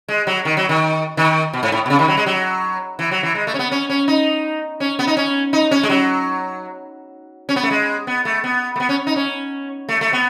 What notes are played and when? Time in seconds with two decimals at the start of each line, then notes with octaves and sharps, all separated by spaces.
0.08 G#3
0.27 F#3
0.45 D#3
0.57 F#3
0.69 D#3
1.17 D#3
1.53 B2
1.63 G#2
1.72 A2
1.86 B2
1.90 C#3
1.99 D#3
2.08 F#3
2.17 G#3
2.26 F#3
2.99 E3
3.11 F#3
3.23 E3
3.35 G#3
3.47 A3
3.54 C#4
3.59 B3
3.72 C#4
3.89 C#4
4.08 D#4
4.80 C#4
4.99 B3
5.07 D#4
5.17 C#4
5.53 D#4
5.71 C#4
5.83 G#3
5.89 F#3
7.49 C#4
7.56 B3
7.63 A3
7.71 G#3
8.07 B3
8.25 A3
8.44 B3
8.76 A3
8.80 B3
8.89 C#4
9.07 D#4
9.16 C#4
9.89 A3
10.01 A3
10.13 B3